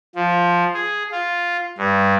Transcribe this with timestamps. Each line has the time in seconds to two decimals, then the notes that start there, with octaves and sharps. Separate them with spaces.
0.15 F3
0.74 G#4
1.12 F4
1.78 G2